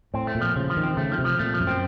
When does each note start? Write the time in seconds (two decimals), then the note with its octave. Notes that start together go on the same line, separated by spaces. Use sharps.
0.14 A2 C4
0.27 A3
0.35 A#2
0.41 F3
0.56 C#3 F3
0.70 F3
0.77 D#3
0.83 C4
0.97 C#3 A3
1.12 F3
1.18 C3
1.25 F3
1.39 A#2 A3
1.54 F3
1.60 F#2
1.67 C4